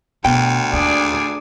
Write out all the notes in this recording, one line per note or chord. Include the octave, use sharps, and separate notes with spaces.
D2 B2 G5
D#2 D4 G#4 D5